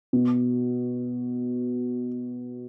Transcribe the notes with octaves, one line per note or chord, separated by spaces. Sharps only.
B2